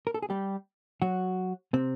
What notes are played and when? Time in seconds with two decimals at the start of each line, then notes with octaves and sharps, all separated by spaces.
0.07 A#4
0.14 A4
0.22 G#4
0.30 G3 G4
1.02 F#3 F#4
1.73 C3 C4